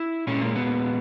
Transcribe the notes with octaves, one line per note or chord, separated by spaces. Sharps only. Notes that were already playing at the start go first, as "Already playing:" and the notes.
Already playing: E4
A#2 G#3 C#4
A#3
B3